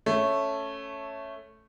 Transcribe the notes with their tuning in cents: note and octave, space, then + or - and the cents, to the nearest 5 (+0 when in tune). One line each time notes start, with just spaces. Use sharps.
A3 +0 C#4 +0